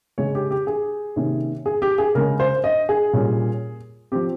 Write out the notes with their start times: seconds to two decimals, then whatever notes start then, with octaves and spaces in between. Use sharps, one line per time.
0.18 C#3 G#3 C#4 C#5
0.35 G4
0.51 G4
0.67 G#4
1.16 C3 D#3 A#3 C#4
1.66 G#4
1.82 G4
1.98 G#4
2.15 C#3 G#3 C#4 A#4
2.40 C5
2.64 D#5
2.89 G#4
3.13 A#2 G3 C#4
4.12 F3 C4 G4